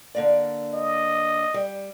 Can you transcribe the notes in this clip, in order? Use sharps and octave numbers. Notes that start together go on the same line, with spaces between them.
D3 A#3 D5
D#5
G3